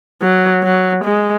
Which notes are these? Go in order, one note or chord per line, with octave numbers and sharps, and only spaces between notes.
F#3
F#3
G#3